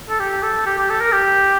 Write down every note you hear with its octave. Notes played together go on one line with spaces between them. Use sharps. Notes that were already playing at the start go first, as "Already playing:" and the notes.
A4
G4
A4
G4
G4
A4
A#4
G4